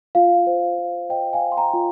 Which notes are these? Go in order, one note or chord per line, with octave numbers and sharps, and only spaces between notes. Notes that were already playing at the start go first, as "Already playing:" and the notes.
F4 F5
C5
F4
C5 D#5 G5
F5 G#5
C5
C6
G5 A#5
F4